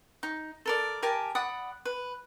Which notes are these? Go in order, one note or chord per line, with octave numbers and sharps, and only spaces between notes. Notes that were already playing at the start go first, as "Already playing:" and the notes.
D#4
A4 A#4 D5
G4 A#4 G#5 A5
D5 F#5 B5 D#6
B4